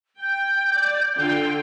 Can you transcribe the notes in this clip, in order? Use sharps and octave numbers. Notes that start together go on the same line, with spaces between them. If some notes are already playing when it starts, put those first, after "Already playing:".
G5 G6
D5
D3 F4 G5